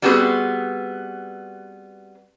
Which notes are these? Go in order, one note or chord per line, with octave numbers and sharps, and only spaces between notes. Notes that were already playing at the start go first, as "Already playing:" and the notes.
G3 B3 C4 F#4 G#4 B4